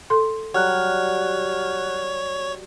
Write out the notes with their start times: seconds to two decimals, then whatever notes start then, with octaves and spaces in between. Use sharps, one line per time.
0.10 A4 C6
0.54 F#3 G3 C#5 F#5 F6 F#6